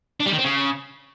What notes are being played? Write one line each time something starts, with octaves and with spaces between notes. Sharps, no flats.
D4
G3
D#3
C4
C#3